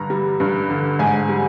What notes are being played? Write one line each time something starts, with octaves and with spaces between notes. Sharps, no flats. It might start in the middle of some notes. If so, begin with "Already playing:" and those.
Already playing: G2 D3 A#5
G3
G2
D3
G#2 G#5
G3